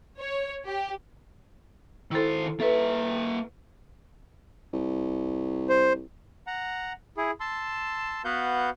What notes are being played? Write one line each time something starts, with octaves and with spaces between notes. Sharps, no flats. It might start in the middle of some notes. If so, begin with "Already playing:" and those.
C#5
G4
D#3 E4 A4 C5
A#3 A4 B4 E5
C2
C5
F#5 A#5
E4 G#4
A5 C6 E6
B3 F#4 B4 F5 F#5 G6